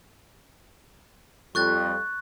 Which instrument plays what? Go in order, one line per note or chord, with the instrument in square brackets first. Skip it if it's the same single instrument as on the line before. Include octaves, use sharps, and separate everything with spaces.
[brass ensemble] F2 G3 [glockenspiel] C#6 F#6 A6